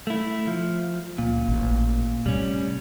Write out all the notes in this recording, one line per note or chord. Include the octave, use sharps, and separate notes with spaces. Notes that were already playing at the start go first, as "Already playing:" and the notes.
A3 E4
F3
C#2 A#2
A1
A2 C3 G3 C#4